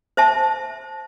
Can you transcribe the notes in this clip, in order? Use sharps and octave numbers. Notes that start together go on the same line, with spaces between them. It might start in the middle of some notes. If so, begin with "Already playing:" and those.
C5 E5 A5